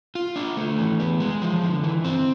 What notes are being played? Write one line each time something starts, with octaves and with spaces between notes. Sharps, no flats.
F4
D4
A3
E3
B3
G#3
F3
D3
E3
C4